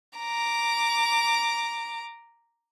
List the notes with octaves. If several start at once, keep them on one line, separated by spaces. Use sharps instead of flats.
A#5 D6